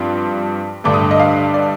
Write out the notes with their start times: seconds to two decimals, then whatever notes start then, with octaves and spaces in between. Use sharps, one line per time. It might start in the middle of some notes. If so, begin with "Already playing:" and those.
Already playing: G2 F3 C4 C6
0.84 G2 D3 A3 D6
0.94 D#6
1.11 D#5
1.20 F5
1.54 D5